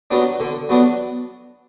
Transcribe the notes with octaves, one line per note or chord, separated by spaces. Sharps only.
F#3 B3 D4
D3
F#3 B3 D4